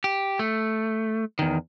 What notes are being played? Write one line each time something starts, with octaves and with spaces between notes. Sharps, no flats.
G4
A3
E2 D#3